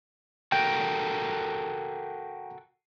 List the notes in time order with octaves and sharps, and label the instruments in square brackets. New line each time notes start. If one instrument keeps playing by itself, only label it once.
[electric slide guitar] F#4 A4 A#4 [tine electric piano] G5